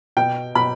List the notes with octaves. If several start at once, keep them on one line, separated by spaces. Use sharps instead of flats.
B2 G5
B2 B5